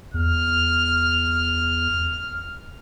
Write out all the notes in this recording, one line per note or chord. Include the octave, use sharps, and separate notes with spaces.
E2 F6